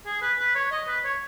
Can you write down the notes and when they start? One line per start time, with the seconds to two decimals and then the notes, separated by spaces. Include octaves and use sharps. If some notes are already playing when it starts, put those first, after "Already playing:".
0.06 G#4
0.22 B4
0.39 B4
0.55 C#5
0.71 D#5
0.88 B4
1.04 C#5